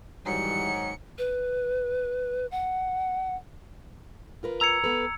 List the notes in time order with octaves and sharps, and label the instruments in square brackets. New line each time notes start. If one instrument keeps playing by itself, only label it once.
[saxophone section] G#2 D#3 F#3 [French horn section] E3 G3 [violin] C#7
[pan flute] B4
F#5
[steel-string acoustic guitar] F4 A#4 B4
[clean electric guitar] A#5 [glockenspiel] E6 G#6 C#7
[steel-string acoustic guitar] B3 A4 B4